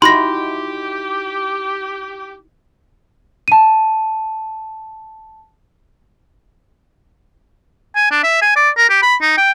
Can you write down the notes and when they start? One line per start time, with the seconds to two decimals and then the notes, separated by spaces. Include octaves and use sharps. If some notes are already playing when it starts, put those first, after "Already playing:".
0.02 D#4 E4 F#4 G4 B5 C6 A#6
3.48 A5 D#7
7.96 G#5
8.11 D4
8.24 E5
8.42 G#5
8.56 D5
8.77 A#4
8.90 G4
9.03 B5
9.22 D#4
9.37 G5